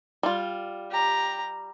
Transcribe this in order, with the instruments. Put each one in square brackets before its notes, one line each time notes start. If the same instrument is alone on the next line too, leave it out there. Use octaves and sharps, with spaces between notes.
[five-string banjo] G3 F4
[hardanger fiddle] G4 A#5